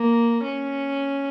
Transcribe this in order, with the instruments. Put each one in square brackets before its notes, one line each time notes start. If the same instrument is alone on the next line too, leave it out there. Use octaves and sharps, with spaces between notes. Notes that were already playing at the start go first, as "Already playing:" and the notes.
Already playing: [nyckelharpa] A#3
C#4